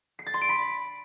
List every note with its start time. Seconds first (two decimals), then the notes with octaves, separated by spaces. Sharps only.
0.19 C7
0.26 A6
0.34 C6
0.41 D7
0.49 B5